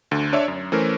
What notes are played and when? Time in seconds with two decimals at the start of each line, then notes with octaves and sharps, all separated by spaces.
0.11 D2 D3
0.33 D4 C#5 D5 E5
0.48 F#2
0.72 E3 A3 C#4 A#4 C5